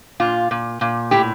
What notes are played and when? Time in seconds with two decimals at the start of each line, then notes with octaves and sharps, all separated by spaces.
0.20 A#2 F4
0.51 A#2
0.81 A#2
1.11 A2 G4